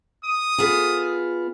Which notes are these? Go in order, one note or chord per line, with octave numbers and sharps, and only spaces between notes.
D#6
B3 F4 G#4